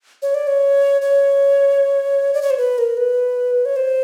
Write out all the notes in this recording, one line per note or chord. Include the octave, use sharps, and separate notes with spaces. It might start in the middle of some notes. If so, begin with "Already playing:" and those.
C#5
D5
C#5
C#5
D5
C#5
C5
B4
A#4
B4
C#5
C5